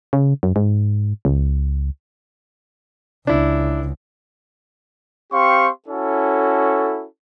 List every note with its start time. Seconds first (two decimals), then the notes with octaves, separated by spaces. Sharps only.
0.13 C#3
0.43 F#2
0.56 G#2
1.25 C#2
3.27 C#2 D4 E4
5.33 C4 G4 F5 C6 C#6
5.89 C#4 E4 F#4 A4